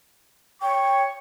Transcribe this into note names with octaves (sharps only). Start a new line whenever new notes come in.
C#5 G5 C#6